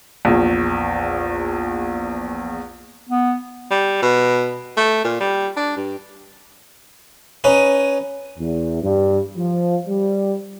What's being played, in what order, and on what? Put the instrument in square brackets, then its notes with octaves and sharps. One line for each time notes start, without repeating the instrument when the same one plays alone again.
[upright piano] A#1 E2
[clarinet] B3
[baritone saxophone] G3
B2
A3
A#2
G3
D4
G2
[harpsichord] C#4 D#4 B4
[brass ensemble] E2
G2
F3
G3